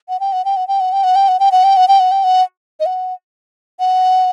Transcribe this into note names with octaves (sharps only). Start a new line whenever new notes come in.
F#5
G5
F#5
G5
F#5
G5
F#5
G5
F#5
G5
F#5
G5
F#5
G5
F#5
G5
F#5
G5
F#5
D#5
F#5
F#5